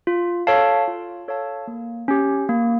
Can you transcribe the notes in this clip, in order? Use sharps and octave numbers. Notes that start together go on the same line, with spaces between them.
F4
A4 C#5 F5 A5
F4
A4 C#5 F5 A5
A#3
C#4 G4
A#3